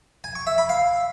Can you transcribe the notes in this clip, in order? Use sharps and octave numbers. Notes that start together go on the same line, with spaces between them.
G#5
C#6
E5
B5
F5